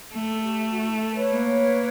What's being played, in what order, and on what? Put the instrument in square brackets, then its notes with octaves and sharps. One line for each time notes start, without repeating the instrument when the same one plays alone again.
[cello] A3 [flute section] A4
[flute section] G4
F#4
E4
A4
B4 C#5
[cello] A#3